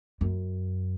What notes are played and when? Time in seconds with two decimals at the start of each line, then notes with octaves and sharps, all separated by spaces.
0.21 F#2